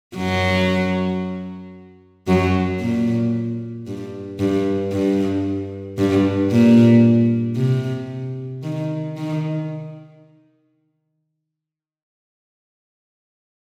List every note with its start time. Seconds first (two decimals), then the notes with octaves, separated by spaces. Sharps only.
0.16 F#2 F#3
2.28 F#2 F#3
2.80 A#2
3.87 G2
4.40 G2
4.92 G2
5.98 G2
6.51 A#2
7.57 C3
8.63 D#3
9.17 D#3